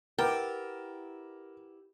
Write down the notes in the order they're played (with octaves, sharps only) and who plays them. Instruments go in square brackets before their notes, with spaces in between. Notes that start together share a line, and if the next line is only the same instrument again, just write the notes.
[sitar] E4 G4 [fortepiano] A#4 [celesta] B4 F#5 A6 [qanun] G5